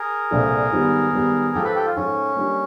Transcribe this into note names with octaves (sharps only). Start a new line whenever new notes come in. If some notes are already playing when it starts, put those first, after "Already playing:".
Already playing: G#4 A#4
C2 A#2 F3 A3 D4
G#2 D#3 G3 B3
G#2 D#3 G3 B3
G#2 F3 A3 G4 A4
A4 B4
G4 A4
F4
G#2 F3 A3 C#4
D3 G3 A#3